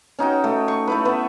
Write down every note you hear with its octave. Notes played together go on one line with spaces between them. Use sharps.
C#4 D#4 F#4 G5
A3
C#6
A3 E4 B4
B3 B4 E5